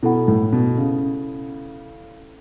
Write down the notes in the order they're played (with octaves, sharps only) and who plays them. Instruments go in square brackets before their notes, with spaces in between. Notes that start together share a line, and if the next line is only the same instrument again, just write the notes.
[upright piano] B2 [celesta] E4 A4 F#5 B5
[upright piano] A2
B2
C#3